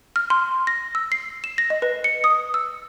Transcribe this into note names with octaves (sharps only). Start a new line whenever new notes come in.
F6
C6
A#6
E6
C7
E7
A#6
D#5
B4
C#7
D#6
E6